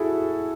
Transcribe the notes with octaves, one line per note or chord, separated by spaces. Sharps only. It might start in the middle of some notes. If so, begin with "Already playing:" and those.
Already playing: E4 F#4 G#4 A4